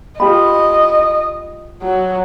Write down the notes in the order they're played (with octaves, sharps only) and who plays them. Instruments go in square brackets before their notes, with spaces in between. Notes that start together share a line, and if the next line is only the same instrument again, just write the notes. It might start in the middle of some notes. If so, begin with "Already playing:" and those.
[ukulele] F4 G4 B5 [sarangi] D#5
[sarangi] F#3